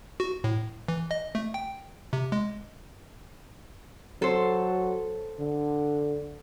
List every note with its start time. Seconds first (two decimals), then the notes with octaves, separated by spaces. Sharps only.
0.20 F#4
0.44 A2
0.88 E3
1.11 D#5
1.35 A3
1.54 G5
2.13 C3
2.32 G#3
4.22 F#3 A4 C5
5.39 D3